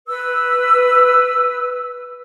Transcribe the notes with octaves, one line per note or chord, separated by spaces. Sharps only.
B4 E6